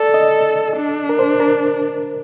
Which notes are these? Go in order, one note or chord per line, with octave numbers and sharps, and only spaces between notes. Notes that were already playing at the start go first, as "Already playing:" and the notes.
Already playing: A4 D5
D#5
D4
A#4
C5
A#4